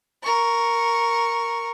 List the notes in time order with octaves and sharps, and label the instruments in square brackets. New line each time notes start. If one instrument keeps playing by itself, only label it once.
[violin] A#4 C#6